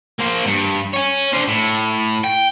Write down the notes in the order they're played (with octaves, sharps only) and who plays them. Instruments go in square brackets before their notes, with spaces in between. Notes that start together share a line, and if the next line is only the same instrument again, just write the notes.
[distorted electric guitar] A#3 C5
G2
C#5 G#5
D4 C5
A2
G5